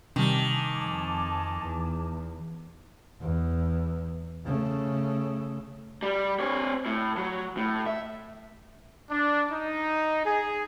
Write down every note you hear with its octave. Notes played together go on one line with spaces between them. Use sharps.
C3 D#3 G3 G#5 A5 D6
F2
E2
E2
C#3 A3
G3
C4 C#5
A2
F#3
A2
E5
D4
D#4
G#4